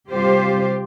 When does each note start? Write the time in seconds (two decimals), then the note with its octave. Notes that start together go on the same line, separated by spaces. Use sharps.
0.10 C3 G3 F4 G4 C5